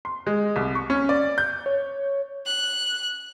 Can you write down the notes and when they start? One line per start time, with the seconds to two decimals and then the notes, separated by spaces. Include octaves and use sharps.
0.05 C6
0.27 G#3
0.56 C2
0.75 C#6
0.90 C#4
1.09 D5
1.38 G6
1.66 C#5
2.46 F#6